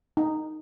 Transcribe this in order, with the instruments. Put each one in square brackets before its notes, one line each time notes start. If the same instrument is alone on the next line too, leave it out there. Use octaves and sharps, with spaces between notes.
[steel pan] D#4